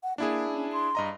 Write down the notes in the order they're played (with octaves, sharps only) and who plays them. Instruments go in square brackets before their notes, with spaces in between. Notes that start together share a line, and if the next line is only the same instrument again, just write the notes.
[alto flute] F#5
[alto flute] A#3 [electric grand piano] D4 E4 G#4
[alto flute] C#4
C6
[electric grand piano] G2 D#5 A#5